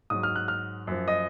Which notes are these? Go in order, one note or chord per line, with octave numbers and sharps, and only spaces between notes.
G#2 F#3 D#6
F6
F#6
F6
F#2 F3
D#5